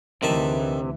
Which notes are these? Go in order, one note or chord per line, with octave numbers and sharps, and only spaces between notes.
D2 C3 D#3 E3 E5 A5